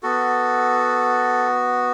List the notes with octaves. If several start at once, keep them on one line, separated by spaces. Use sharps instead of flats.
B3 F#4 A4